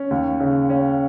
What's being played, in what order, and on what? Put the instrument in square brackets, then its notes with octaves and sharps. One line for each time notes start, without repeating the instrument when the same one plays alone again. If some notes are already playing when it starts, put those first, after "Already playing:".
Already playing: [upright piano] C#4
D#2
C#3
C#4